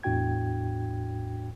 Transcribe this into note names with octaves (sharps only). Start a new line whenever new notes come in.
E2 A2 D4 F#4 G5 G#6